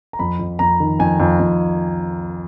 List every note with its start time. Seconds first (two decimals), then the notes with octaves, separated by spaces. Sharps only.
0.13 A#5
0.19 F2 B5
0.39 F2
0.59 F2 A#5
0.80 D#3
0.99 F2 G#5
1.20 F2
1.40 F2